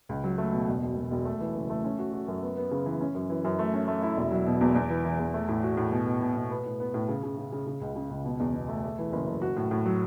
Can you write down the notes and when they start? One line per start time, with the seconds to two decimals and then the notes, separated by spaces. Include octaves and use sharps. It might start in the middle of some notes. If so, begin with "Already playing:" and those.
0.09 C#2
0.24 F#3
0.38 A3
0.53 B2
0.67 E1
0.82 E1
0.96 E1
1.11 E1
1.25 A3
1.40 E3
1.55 F#1
1.70 A3
1.84 C#4
1.99 F#4
2.13 F#4
2.28 F#2
2.42 B3
2.57 B3
2.71 C#3
2.86 E3
3.01 C#4
3.15 F#2
3.30 E3
3.44 F#2
3.59 A3
3.74 C#4
3.88 A3
4.02 E4
4.17 E1
4.31 F#3
4.46 B2
4.61 E2
4.75 E2
4.90 E3
5.05 E3
5.19 E2
5.34 A3
5.48 A2
5.63 F#4
5.77 A2
5.92 B2
6.06 B2
6.21 B2
6.36 B2
6.50 B3
6.65 A2
6.80 B3
6.94 A2
7.08 C#3
7.23 C#3
7.37 C#3
7.52 C#3
7.67 C#3
7.81 C#2
7.96 C#3
8.10 C#2
8.25 B2
8.40 E2
8.54 B2
8.69 A3
8.83 A3
8.98 E3
9.13 F#1
9.27 F#1
9.42 F#4
9.56 A2
9.71 A2
9.86 F#3